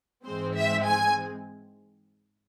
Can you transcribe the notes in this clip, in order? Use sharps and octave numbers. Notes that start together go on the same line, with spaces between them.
G#2 E3 G#3 C4 C5
E5
G#5